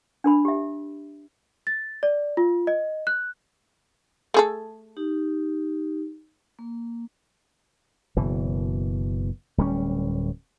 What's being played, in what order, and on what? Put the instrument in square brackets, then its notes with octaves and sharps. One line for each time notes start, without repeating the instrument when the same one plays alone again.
[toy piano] D4 A#4 B5
G4 E5
[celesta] A6
D5
F4
D#5
F#6
[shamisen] A3 G#4 A4
[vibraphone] D#4 G4
A#3
[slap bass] F#1 B2 E3
D1 G3 C#4